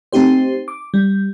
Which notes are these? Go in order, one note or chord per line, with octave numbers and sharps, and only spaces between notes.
A3 C4 D#4 G4 C5
D6
G3